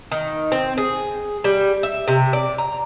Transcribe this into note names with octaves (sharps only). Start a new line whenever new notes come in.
D#3
C4
G#4
G3
E5
C3
D5
A#5